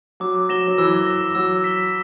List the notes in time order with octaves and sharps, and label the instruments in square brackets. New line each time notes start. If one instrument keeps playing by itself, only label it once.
[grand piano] F#3 [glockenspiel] D6
[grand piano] F#3 [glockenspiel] A#6 E7 G7
[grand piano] F#3
[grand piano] E3 [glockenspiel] E6
[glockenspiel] A#6 E7
[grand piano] F#3 [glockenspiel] E6
[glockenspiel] B6 E7 G7